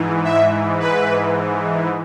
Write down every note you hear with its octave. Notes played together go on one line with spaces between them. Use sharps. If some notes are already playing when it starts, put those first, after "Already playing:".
Already playing: G#2 E3
E5
B4